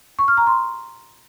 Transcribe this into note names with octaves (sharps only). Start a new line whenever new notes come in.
C#6
F6
A#5
C6